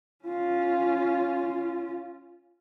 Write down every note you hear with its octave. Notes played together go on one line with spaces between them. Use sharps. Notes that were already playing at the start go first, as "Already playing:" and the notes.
C#4 F4